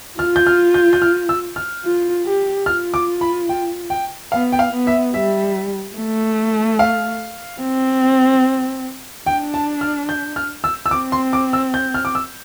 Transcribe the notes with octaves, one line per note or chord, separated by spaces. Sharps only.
F4 F6
G6
F6
G6
G6
F6
E6
F6
F4
G4
F4 F6
D6
B5
G5
G5
B3 F5
G5
F5
B3
E5
G3 E5
A3
F5
C4
D4 G5
A5
F6
G6
F6
E6
E6
C4 D6
C6
D6
E6
G6
F6
D6
E6